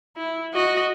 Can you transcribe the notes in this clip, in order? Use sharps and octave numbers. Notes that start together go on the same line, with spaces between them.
E4
F#4 D#5